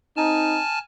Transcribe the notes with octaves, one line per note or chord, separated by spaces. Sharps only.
C4 D#4 G#5 A5 F6